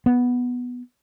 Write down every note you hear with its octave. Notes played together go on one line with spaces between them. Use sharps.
B3